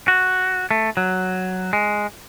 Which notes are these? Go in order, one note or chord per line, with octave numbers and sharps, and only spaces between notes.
F#4
A3
F#3
G#3